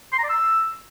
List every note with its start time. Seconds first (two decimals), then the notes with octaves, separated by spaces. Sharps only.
0.13 C6
0.18 A#5
0.24 D5
0.29 E6